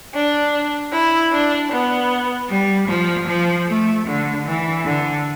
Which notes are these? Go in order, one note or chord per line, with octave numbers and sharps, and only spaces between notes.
D4
E4
D4
B3
G3
F3
F3
A3
D3
E3
D3